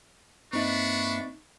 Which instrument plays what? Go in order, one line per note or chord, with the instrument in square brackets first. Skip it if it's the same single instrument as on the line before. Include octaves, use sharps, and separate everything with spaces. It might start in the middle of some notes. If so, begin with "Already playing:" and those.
[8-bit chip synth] G2 A#3 E5 [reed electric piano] C4 D#4 [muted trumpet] D4 [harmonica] B4 C#6